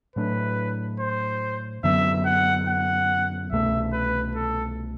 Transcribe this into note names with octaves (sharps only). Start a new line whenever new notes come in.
A2 F#3 A3 D4 B4
C5
F#2 D3 F#3 B3 E5
F#5
F#5
C2 B2 A3 E5
B4
A4